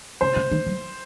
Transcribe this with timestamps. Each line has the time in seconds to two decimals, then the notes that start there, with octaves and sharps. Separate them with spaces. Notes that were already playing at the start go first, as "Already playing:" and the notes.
0.21 C#3 C5
0.36 C#3
0.51 D#3
0.67 F#3